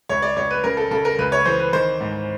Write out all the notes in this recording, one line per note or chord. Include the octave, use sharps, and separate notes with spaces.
C#2 C#5
D5
C#2 C#5
B4
C#3 A#4
A4
C#3 A4
A#4
C#2 B4
C#5
E3 C5
B4
D#3 C5
G#2